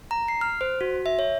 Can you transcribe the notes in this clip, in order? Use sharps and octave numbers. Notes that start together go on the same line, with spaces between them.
A#5
C7
F6
C5
F#4
E5
C#5